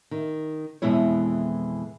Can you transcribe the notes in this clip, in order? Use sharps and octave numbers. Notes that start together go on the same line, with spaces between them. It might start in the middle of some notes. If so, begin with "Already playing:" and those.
D#3
F2 B2 E3 G#3 E4 C#5